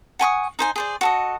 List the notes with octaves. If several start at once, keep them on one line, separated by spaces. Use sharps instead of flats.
F#5 G#5 C#6 D#6
D#4 C5 G#5
G#4 C5 D5
F#4 A4 D#5